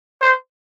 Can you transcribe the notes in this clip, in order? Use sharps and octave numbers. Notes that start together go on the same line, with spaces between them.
C5